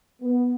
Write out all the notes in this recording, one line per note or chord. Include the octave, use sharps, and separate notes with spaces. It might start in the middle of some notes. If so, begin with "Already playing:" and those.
B3